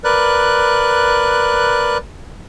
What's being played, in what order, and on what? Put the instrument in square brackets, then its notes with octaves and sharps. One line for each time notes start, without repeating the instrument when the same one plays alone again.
[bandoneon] A#4 B4 D5 F#6